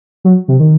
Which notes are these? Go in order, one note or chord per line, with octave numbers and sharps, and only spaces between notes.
F#3
C3
D#3